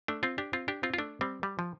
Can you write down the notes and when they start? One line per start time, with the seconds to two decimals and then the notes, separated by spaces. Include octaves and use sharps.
0.08 A3 D4
0.23 C4 F4
0.38 D4 G4
0.53 C4 F4
0.68 D4 G4
0.83 C4 F4
0.94 F4
0.98 A3 D4
1.21 G3 C4
1.43 G3
1.59 F3